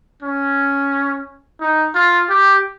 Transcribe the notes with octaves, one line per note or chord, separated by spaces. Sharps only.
C#4
D#4
F4
G4